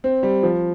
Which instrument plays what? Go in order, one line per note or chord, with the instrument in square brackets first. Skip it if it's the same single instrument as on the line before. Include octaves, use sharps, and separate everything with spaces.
[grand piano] C4
G3
F3